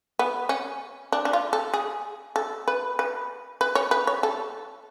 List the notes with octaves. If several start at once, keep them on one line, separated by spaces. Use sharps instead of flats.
B3
C#4
D4
D4
F4
A4
G#4
A4
B4
B4
B4
C#5
B4
C#5
A4